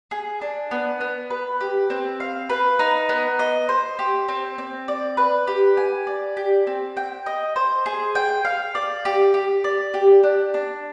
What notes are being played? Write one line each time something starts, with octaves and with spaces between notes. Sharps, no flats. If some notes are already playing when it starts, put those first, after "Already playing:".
G#4
D4
B3
B3
B4
G4
C4
F5
B4
D#4
B3
D#5
C5
G4
C4
C4
D5
B4
G4
G#5
D5
G4
C4
G5
D#5
C5
G#4
G5
F5
D5
G4
G4
D5
G4
D4
D4